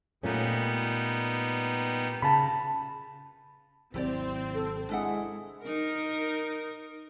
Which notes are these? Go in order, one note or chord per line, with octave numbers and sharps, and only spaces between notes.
A#2 G3 A3 B3 C#4 D#4
C#3 A5 B5
G#1 C3 F#3 C4 E4 G4 D5
A4
G#3 D4 E4 F#5
D#4 A#4